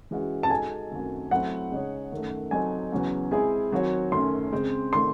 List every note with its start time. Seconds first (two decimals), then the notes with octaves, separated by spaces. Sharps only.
0.11 E3 G#3 C#4 F#4
0.43 A5
0.50 G#3 D#4 F#4 A4 G#5
0.91 F#2 D#3 A3 C4 F#4
1.31 F#3 A3 C4 E4 C5 F#5
1.72 C#3 G#3 D#4 G#4 C#5
2.12 F#2 D#3 A3
2.51 F#3 C4 D#4 A4 G#5
2.92 E2 C#3 F#3 C#4 F#4
3.31 G#3 C4 E4 G#4 G#5
3.72 D#3 F#3 C4 F#4 C#5
4.12 F#2 D#3 A3 C#4 C6
4.52 C#3 G#3 C4
4.93 D#3 A3 C4 C6